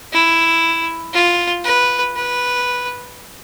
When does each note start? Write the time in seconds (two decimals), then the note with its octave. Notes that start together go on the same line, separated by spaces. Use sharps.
0.13 E4
1.14 F4
1.65 B4
2.16 B4